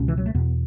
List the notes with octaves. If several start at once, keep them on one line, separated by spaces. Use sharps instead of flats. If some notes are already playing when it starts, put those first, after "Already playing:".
Already playing: C#2 B2 C#4
E3
F#3
A3
E2 B2 B3